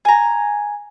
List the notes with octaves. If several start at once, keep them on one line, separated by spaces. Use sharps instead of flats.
G#5 A#5